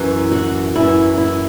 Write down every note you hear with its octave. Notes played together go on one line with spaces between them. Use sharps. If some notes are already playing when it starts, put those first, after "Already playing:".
Already playing: F#2 E3
F#4
F#2 E3 E4
E4